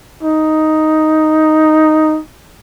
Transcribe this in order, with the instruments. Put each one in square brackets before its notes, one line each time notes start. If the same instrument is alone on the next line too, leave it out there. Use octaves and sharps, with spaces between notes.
[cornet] D#4